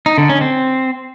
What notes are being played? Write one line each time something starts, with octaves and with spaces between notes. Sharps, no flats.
D#4
D3
C#4
C4